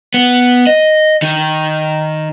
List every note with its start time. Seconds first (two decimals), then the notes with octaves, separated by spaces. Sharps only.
0.14 B3
0.67 D#5
1.22 D#3